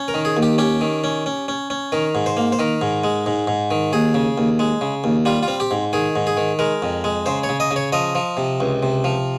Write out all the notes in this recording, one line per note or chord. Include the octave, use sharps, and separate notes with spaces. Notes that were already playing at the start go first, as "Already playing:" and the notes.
Already playing: C#4
A#4
D#3
G#4
D#2
G4
C#4 G4
D#3
C#4
C#4
C#4
C#4
D#3 A#4
G#2
C5
A#3
C5
D#3 A#4
G#2
G#3
G#2
G#2
D#3
D#2 G#4
C#3
D#2
G#3
C#3
D#2
G3 F4
F4
C4
G4
G#2
D#3 G#4
G#2
G#4
D#3
G#3 A#4
F2
G#3
C#3 C5
C#5
C#3
D#5
C#3
C#5
F3 D#5
F3
C3
C#2
C3
F3